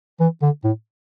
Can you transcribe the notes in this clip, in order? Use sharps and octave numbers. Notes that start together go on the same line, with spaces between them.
E3
D3
A2